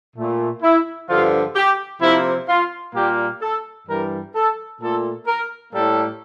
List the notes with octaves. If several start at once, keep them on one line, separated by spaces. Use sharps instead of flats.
A#2 A3
E4
G2 D3 F3 F4
G4
C3 F3 A#3 E4
F4
A#2 G3 A#3 G4
A4
G2 E3 G3 A#4
A4
A#2 A3 A4
A#4
A2 G3 A#3 A4